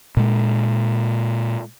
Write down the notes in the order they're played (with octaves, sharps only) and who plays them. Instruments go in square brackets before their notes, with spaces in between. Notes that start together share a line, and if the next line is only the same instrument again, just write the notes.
[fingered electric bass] A#2 G#3